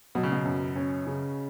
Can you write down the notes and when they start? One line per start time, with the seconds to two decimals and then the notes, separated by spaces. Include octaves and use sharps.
0.15 B2 F#3
0.23 C#3
0.32 B2
0.45 F#2
0.76 C#4
1.07 C#3